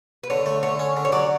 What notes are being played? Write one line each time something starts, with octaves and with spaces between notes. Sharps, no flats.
B4
D3 C#5
A3
D3 C#5
C#4
D3
C#5
F#3 D5